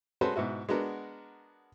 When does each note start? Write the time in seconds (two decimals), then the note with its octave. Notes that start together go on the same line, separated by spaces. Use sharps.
0.21 G#3 C#4 F#4 A4 B4 C5
0.36 G#2 B2 E4 F#4
0.69 G#3 B3 D4 F#4 A#4